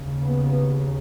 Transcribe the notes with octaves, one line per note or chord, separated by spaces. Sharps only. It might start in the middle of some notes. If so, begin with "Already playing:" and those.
Already playing: D#2 C#3
B3